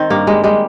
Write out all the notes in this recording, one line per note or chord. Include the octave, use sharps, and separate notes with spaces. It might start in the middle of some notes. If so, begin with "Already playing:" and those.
Already playing: D#3 C4
G2 A#3
G3 G#3
G3 G#3